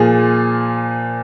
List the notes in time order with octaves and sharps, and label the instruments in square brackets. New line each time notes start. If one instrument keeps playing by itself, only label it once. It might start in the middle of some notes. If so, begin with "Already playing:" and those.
Already playing: [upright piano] A#2 F3 G#4